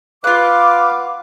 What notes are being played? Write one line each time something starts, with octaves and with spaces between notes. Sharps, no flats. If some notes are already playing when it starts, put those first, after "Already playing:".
F4 B4 F5 F#5 D6